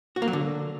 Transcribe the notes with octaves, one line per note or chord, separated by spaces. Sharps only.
F#4
A#3
F#3
D3